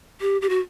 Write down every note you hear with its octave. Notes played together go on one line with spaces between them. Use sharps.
G4
G4
F#4